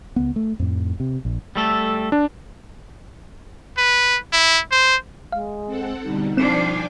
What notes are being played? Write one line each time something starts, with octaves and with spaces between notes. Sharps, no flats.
C#2 B3
A3
F2 A2
C3
A#1
G3 A3 A4
D4
B4
E4
C5
G#3 F5
C4 A4 F#5
B2 D3 G3 D#4
F3 C4 D4 G5 G#5 D6 E7